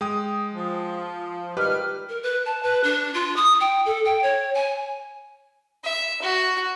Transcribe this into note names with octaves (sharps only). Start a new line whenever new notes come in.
G#3 G5 D#6
F3
G#2 D#3 G3 G4 B4 F6
A#4
B4
A5
B4
D4
F4
D#6
G5
A4
G5
C#5
G#5
E5
F#4